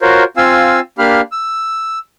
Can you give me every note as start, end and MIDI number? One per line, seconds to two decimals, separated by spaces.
0.01 0.24 65
0.01 0.24 66
0.01 0.24 70
0.01 0.24 72
0.01 0.24 73
0.37 0.80 60
0.37 0.80 65
0.37 0.80 77
0.37 0.80 80
0.37 0.80 88
0.98 1.21 58
0.98 1.21 62
0.98 1.21 67
0.98 1.21 77
0.98 1.21 83
0.98 1.21 89
1.32 1.99 88